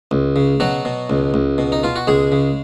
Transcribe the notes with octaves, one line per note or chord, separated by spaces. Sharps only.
C#2
C#3
B2 F#3 F#4
B2
C#2
C#2
B2
D#4
B2 F4
F#4
C#2 G#3 G#4
C#3